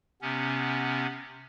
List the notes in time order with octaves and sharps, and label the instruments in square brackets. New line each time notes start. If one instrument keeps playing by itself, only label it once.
[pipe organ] C3 B3 C#4